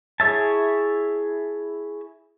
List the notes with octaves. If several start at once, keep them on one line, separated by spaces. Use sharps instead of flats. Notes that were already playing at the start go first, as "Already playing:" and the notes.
E4 G#4 C#5 E5 A5